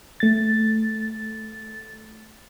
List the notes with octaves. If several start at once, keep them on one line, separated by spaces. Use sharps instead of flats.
A3 A6